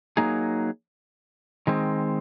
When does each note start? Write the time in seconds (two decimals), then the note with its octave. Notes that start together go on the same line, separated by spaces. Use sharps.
0.17 F#3 A#3 D#4 G#4
1.67 D#3 G#3 C4